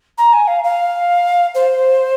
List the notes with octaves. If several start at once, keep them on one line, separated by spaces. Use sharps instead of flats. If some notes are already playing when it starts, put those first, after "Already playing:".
A#5
G#5
F5
F5
C5